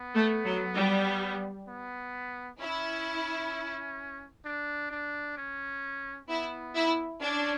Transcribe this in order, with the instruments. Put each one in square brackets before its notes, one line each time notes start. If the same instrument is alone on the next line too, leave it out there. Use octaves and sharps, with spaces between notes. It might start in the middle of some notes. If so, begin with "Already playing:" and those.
Already playing: [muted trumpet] B3
[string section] A3
F#3
G3
[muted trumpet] B3
[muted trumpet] C#4 [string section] E4
[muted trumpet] D4
D4
C#4
[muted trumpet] B3 [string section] E4
[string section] E4
[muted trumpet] C#4 [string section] D4